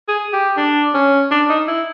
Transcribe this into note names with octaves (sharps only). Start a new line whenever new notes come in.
G#4
G4
D4
C#4
D4
D#4
E4